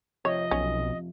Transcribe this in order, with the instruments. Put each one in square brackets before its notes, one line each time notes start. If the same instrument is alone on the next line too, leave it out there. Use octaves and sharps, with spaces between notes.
[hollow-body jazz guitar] F2 C3 F3 [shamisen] C#5 [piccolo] D#5
[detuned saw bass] B1 [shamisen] C#4